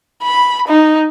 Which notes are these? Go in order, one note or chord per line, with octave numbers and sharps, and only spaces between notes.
B5
D#4